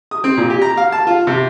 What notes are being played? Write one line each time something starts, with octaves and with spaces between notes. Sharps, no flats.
D#6
C4
A#2
G4
A#5
F5
A5
F4
C3